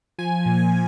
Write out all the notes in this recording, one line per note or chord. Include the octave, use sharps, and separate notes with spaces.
F3 G#5
A#2
G#5
F3